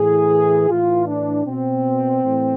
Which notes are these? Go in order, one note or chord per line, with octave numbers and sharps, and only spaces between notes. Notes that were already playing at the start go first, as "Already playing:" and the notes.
Already playing: A2 E3 G#4
A2 E3 F4
D4
B2 C4
A2 E3